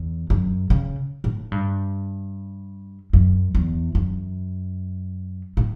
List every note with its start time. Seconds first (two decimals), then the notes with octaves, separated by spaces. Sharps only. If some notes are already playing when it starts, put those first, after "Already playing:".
Already playing: E2
0.30 F#2
0.70 C#3
1.24 A2
1.52 G2
3.13 F#2
3.55 E2
3.95 F#2
5.57 A2